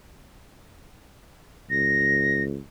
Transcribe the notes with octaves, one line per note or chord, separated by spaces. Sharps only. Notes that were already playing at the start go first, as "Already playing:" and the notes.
C#2 A#6